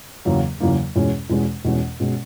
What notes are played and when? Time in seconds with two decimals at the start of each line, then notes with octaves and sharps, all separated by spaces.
0.25 E2 C#3 F#3 A#3
0.60 E2 C#3 F#3 A#3
0.96 E2 B2 G#3 C#4
1.30 E2 B2 G#3 C#4
1.65 E2 B2 G#3 C#4
2.00 B2 G#3 C#4